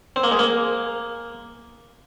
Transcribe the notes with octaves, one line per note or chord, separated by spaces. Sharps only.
C4
A#3
G#3
A#3